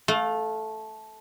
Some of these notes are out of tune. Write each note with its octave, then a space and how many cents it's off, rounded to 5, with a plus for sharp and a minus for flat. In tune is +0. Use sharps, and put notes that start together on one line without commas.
A3 -10 F5 +25